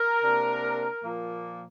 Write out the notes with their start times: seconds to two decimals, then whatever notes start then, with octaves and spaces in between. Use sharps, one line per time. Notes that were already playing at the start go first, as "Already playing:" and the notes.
Already playing: A#4
0.23 C3 A#3 D4
1.02 A#2 F3 A#3